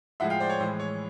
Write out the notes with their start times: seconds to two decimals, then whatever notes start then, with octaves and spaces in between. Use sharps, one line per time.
0.20 A2 F3 G#3 E5 F#5
0.30 F5 G5
0.40 C5 D5
0.49 C#5
0.60 A2 E3 G#3 C5
0.80 C#5